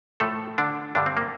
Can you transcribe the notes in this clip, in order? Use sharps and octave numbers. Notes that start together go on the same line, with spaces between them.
A2 F3 A3 A4
D3 D4
G2 D3 G3 D4
C4
A#3